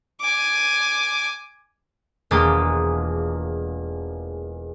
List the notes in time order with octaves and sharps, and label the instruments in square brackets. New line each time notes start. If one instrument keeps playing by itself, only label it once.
[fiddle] G#5 D6
[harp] E1 G#3 A#3 F4 G4 D#6